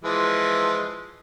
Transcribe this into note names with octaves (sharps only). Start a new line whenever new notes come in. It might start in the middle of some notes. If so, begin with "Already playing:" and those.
E3 F3 G#3